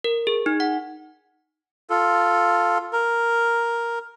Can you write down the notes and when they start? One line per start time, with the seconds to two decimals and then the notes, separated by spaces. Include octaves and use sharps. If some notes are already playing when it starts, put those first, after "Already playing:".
0.04 A#4
0.27 G#4
0.46 D#4
0.60 F#5
1.90 F4 A4
2.93 A#4